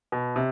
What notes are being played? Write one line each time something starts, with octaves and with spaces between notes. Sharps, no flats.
B2
C3